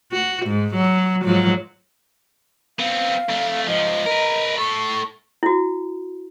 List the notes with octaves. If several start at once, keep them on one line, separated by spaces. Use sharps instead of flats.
F#4
G#2
F#3
G#2 F3 F#3
B3 C4 F5
F2 A3
G#2 F3 D#5
A#4 B4
A2 A4 C#6
E4 F#4